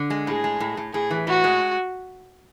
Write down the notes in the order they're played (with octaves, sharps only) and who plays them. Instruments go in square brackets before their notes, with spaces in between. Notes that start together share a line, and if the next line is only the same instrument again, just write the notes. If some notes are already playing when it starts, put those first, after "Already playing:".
Already playing: [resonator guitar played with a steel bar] D3
G#3
[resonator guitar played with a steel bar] A2 [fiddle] G#4
[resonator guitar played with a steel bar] G#3
A2
A2
[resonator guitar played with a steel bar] A2 [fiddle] G#4
[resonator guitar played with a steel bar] E3
[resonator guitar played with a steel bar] A2 [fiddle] F#4
[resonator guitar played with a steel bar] G#3